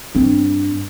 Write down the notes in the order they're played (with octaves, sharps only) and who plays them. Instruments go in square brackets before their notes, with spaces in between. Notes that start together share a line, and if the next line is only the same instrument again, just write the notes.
[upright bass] G2 C4